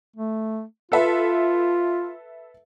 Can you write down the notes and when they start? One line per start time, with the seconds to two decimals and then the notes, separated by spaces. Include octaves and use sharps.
0.16 A3
0.92 F4 A4 B4 E5